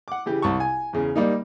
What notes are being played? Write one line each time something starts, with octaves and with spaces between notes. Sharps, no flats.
F#5 D6
C#3 E3 G4
C2 A5 C#6
G#5
E2 C#3
G3 A#3 D#4